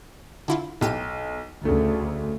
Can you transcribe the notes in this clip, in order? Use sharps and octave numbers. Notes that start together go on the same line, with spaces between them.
D3 E4 F4
B1 A2 G4 D#7
D2 C#3 A3